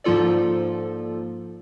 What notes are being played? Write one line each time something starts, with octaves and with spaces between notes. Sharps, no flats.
G#2 F3 A#3 F4 A4 D5